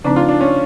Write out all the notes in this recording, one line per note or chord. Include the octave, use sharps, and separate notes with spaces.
C#3 F3 A3 C4 D4 D#4
F4
D4
C#4